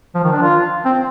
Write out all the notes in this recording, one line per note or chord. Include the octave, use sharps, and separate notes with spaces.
F3
D#3
D4
F4
C4